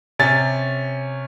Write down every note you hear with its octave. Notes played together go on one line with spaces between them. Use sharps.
C3 C#4 A6